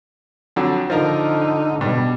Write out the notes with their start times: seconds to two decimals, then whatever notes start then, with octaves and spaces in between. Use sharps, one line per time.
0.56 F2 D3 F#3
0.90 D3 F3 D#4 F4 A#4
1.81 G2 B2 G3